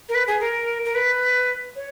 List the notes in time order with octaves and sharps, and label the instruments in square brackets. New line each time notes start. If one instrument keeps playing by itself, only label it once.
[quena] A#4
B4
G#4
A#4
A#4
B4
C#5